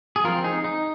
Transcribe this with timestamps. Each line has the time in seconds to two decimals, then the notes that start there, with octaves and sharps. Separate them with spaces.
0.16 G#4
0.24 F3 C4 F4 A#4
0.44 D#4 G#4
0.64 D#4